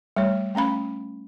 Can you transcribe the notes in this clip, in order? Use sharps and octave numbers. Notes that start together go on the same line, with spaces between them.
G3 A3 C#5
A3 C#4 F5 B5